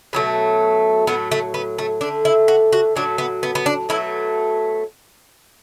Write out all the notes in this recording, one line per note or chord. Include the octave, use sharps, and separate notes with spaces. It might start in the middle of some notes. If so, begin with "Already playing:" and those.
B2 F#3 A3
A2 F#3 A3 B3
A3
B3
A3
D3 A3 D4
E4
F#4
F#4
A2 F#3 A3 D4
B3
B3
B3
D4
B2 F#3 A3 E4